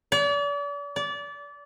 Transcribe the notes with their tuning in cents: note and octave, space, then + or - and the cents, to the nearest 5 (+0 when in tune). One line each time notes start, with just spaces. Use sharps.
D5 -40
D5 -25